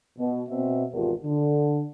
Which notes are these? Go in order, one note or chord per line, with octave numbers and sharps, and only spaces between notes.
B2
B2 C4 E5
G#1 E2 B2 F4 G4 A#4
D3